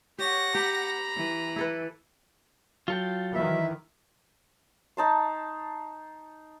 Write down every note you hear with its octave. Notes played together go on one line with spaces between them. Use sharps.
G4 C#5 F#5 A#6
G4 A#5 B5
E3
E4 A4 B4
F#3 F4 A4 G5
D#3 E3 E5
D#4 A5 C6